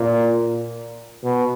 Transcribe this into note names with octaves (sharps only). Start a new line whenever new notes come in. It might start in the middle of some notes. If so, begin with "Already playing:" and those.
Already playing: A#2
B2